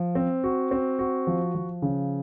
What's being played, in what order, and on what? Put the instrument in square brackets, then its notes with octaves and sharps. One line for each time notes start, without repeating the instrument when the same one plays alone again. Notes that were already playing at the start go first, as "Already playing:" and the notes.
Already playing: [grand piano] F3
C4
F#4
C4
F#4
F3
F3
C#3